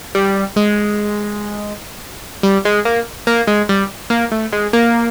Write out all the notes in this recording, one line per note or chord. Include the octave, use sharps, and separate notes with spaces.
G3
G#3
G3
G#3
A#3
A#3
G#3
G3
A#3
A3
G#3
A#3